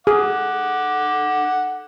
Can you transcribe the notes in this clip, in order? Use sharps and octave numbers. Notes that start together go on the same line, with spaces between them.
G#4 F#5 D6